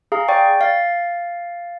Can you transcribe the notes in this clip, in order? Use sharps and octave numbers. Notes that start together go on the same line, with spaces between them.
G#4 F5 A#5
D5 G5 C#6
F5 A6